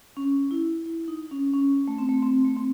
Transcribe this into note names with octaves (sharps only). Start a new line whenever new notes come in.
C#4
E4
E4
D#4
C#4
C#4
A3
C4
A3
C4
A3
C4